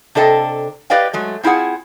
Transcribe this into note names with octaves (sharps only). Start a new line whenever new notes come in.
C3 D4 A4 D#5 G5
G4 B4 D5 D#5 F5 G5
F#3 G#3 A3
C4 E4 F4 G#4 F#5